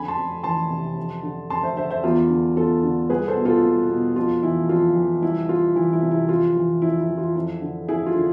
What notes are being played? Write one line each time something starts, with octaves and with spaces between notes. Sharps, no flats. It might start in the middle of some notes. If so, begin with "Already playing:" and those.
Already playing: F2 D3 G#5 B5
A5 C6
F2
E3 A5 C6
C3
F2
D3
F2 A5 C6
C5 E5
D3 C5 E5
C5 E5
E2 F4
D3
E2 F4 A4
D3
C2 G#4 B4
A4 C5
B2
F4 A4
C2
B2
F2 F4
E3 E4
F2 F4
E3
C2 E4
C2 F4
E3 E4
E4
C3
E4
F2 F4
E3
F2 E4
E4
E3
F4
F2 E4
D3
F2 E4 G#4
F4
D3